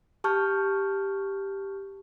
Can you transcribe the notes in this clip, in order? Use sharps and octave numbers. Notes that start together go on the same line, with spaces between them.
G4 A5 C#6 F6 G6